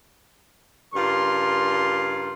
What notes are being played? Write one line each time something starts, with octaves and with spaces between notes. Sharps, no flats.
G2 C#3 G3 F4 A#4 C6